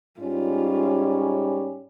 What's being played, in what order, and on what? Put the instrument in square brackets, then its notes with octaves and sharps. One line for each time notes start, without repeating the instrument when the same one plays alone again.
[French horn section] G#2 G3 C#4 [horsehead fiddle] F4